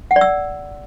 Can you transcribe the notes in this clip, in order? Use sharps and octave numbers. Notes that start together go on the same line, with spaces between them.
F#5
D5
E6